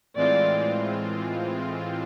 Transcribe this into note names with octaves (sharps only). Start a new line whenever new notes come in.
A2 E3 G#3 C4 F4 D5